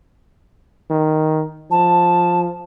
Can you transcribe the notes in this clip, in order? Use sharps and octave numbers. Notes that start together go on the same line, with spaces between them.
D#3
F3 A5